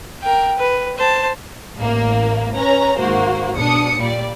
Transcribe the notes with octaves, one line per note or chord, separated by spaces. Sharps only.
A#4 G5
B4
C5 A5
A1 A#3
C#4 B4 A#5
G#1 G#2 A#3 F#4 C5
B2 D4 D#6 C#7
A#2 G3 D5